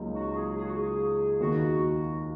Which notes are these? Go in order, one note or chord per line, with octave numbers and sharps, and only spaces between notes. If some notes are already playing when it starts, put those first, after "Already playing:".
Already playing: C#2 C#3 F#3 A#3 D#4
F#4
G#4
G#4
F#4
G#4
D#2 D#3 A#3 D#4 F#4